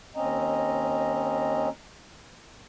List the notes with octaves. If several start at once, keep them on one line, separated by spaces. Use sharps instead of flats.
D#2 C4 C#4 D#5 A#5